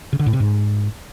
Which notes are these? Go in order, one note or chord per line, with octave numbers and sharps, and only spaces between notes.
C#3
D3
A2
C3
G#2